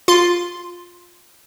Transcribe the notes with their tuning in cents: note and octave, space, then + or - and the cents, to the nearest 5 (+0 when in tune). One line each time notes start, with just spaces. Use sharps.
F4 +10 C6 -10